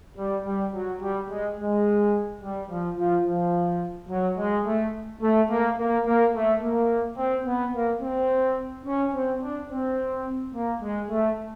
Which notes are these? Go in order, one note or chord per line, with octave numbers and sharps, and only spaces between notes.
G3
G3
F#3
G3
G#3
G#3
G3
F3
F3
F3
F#3
G#3
A3
A3
A#3
A#3
A#3
A3
A#3
C4
B3
A#3
C4
C#4
C4
D4
C4
A#3
G#3
A3